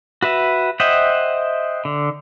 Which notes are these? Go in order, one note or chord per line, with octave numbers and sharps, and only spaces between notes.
F#4 B4 E5
C5 D#5 E5 F#5 G5
D3